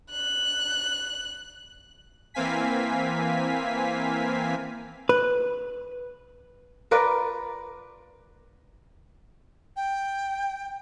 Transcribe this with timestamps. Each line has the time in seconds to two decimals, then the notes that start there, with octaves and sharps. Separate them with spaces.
0.11 F#6
2.34 E3 A#3 C4 F5 G#5 B6
5.09 B4
6.91 F4 A#4 B4 D5
9.76 G5